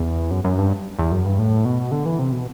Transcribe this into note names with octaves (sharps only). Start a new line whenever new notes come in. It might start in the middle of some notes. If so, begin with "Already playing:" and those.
Already playing: E2
F#2
F#2
G2
E2
F#2
G2
A2
B2
D3
E3
C3
B2